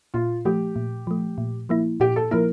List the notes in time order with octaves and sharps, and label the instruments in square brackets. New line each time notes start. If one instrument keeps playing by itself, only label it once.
[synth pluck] A#2 [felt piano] F4
[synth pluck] F3 A3 [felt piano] G4
[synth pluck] A#2
F3 A3
A#2
F3 A#3 E4
[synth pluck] A#2 [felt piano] G4
[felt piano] A4
[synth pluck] F3 A#3 E4 [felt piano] A#4